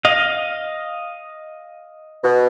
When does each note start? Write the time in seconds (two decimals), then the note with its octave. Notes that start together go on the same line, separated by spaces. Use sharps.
0.05 D#5 F5
2.24 B2